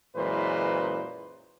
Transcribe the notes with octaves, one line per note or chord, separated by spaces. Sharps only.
F#2 A#2 E3 G#3 B4 C5